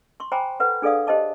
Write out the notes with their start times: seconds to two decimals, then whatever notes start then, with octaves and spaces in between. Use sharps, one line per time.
0.20 C6 C#6
0.32 C5 G5 G#5 A#5 B5 D6
0.60 A4 B4 F#5
0.82 D4 G#4 A4 D5 F5 D#6
1.07 G4 C5 D#5 A5 D6